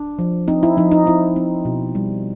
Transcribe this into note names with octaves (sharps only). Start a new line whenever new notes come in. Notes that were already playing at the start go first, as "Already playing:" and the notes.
Already playing: D4
F3
C4 D#4
E4
F3 D#4
D#4
C4 E4
C4
B2
G3